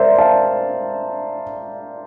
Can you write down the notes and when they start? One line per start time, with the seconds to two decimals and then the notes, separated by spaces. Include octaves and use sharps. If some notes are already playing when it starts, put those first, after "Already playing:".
Already playing: A#4 C5 D5 E5
0.18 F5 A5